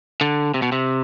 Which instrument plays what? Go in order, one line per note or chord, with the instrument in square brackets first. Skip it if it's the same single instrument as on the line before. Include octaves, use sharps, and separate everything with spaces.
[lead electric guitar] D3
C3
B2
C3